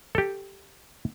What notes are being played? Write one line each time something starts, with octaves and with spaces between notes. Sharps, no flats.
G4 A4